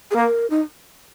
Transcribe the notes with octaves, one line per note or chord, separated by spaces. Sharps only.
G#4
A#3 A#4
D#4